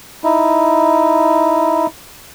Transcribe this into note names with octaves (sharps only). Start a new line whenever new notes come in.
D#4 E4